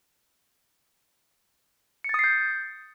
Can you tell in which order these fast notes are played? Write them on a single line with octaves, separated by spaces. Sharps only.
C#7 A6 D#6 C7 G6